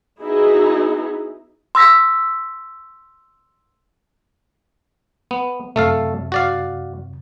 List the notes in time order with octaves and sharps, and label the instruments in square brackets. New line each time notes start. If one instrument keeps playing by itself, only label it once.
[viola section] B3 D#4 E4 F#4 G#4
[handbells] C6 E6 A#6 B6
[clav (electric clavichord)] B3
[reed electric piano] F#2 C3 [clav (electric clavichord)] A3 A4 F5
[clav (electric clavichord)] F#4 D5 F5